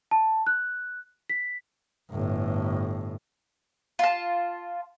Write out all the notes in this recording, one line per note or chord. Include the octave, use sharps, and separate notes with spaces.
A5
F#6
B6
G1 A2
F4 A5